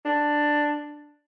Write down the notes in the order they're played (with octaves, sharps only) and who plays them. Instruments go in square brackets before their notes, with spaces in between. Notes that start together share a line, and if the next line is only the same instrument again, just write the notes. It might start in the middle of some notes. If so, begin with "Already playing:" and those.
[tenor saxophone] D4